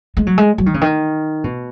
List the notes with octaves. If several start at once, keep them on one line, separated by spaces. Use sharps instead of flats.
G#3
F#3
G#3
F#3
D#3
C#3
D#3
B2